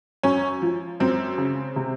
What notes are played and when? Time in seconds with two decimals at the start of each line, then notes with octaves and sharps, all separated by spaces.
0.23 F#2 C#4
0.62 F3
1.00 F#2 C4
1.38 C#3
1.76 C3